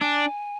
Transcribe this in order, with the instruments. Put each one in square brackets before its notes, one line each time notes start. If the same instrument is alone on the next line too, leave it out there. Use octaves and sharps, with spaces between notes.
[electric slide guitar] D4 [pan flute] G#5